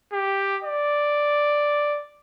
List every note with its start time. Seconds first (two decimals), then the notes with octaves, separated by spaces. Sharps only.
0.13 G4
0.64 D5